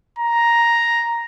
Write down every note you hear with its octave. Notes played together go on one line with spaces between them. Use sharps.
A#5